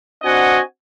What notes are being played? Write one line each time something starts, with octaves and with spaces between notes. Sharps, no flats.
C4 D4 F#4 D#5 F#5 G#5